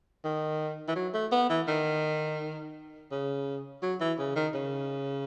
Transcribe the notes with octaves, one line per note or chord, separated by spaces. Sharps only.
D#3
E3
F#3
A3
B3
E3
D#3
C#3
F#3
E3
C#3
D#3
C#3